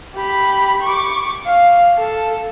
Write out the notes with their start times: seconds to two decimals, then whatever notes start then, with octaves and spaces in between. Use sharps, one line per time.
0.15 G4 B5
0.83 C#6 D6
1.46 F5
1.98 A4